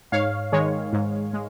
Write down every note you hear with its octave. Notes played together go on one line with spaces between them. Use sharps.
G#2 C#5 F5
D#3 G#3 C#5
G#2
G#3